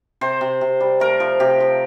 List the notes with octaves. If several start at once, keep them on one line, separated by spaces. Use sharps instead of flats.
C3 C5
C3
C3
G3
A3 A#4
F3
C3 G4
F3